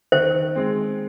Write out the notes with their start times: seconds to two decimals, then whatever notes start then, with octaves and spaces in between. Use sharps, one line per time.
0.12 D#3 C5
0.55 G#3 C4